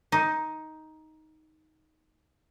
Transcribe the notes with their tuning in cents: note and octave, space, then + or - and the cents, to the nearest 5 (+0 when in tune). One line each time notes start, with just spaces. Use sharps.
D#4 +10